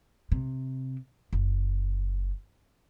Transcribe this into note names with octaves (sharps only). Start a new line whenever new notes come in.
C3
F#1